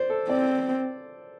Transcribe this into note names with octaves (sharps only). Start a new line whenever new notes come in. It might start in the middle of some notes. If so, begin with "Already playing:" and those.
Already playing: C5 D5
A4
C4 D5